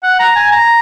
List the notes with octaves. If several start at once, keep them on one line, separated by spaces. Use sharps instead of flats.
F#5
A#5
G#5
A#5